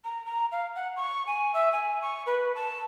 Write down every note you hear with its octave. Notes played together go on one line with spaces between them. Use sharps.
A#5
A#5
F5
F#5
C#6
G#5
E5
G#5
C#6
B4
A5